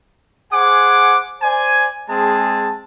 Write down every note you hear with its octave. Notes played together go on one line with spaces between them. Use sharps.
G#4 C5 F#5 G#5 D6
C5 D5 G#5
G#3 C4 G#4 A5